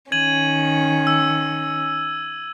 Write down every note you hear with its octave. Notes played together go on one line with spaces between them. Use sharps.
D#3 C#4 G#6 D#7 F#7
E6